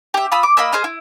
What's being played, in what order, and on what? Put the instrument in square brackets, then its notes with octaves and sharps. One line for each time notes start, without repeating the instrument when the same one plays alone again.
[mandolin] G4 E5
F4 B5 D#6 E6
D6
A#3 D#5 B5 E6
G#4 C5 D#5 F6
E4